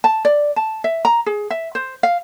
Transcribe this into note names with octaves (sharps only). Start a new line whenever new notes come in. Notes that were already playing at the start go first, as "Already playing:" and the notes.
A5
D5
A5
E5
A#5
G#4
E5
C5
F5